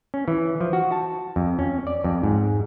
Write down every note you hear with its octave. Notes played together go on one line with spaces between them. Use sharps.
C#4
E3
F3
F#4
A5
F2
C#4
D5
F2
G#2